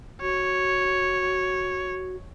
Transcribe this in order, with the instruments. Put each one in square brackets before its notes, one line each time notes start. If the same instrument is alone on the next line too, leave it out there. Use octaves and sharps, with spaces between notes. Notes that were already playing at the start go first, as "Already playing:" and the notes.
[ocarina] F#4 [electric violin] C#5